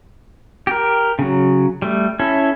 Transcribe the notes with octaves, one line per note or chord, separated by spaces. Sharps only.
G4 A#4
C#3 F#3
G3 A3
C#4 E4 A4